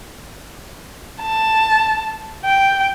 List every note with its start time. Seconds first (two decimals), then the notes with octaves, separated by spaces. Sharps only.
1.22 A5
2.45 G5